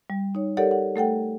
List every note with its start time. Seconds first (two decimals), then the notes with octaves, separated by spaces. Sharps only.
0.10 G3
0.35 D#4 C#5
0.57 G4 A4 A#4 C#5 D5 F#5
0.71 F#5
0.96 A3 A4 F#5 G5